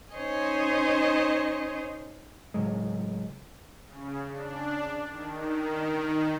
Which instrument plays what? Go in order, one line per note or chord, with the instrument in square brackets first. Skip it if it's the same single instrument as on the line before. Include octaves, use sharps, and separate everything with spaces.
[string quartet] C#4 D#4 C5 C#5 D#5 G#5
[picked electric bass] A2 C#3 F#3 G#3
[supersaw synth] C#3
D4
D#3